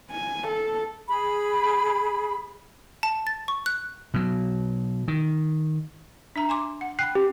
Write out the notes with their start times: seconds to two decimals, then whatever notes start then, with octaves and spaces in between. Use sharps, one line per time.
0.11 G#5
0.48 A4
1.08 G#4 B5
3.03 A5
3.27 A6
3.48 C#6
3.66 F#6
4.14 B2 F#3
5.08 D#3
6.36 D4 E5 A#5
6.49 G#5 C6 D6
6.81 F#5
6.99 G5 B5 F#6 C7
7.15 C#4 G4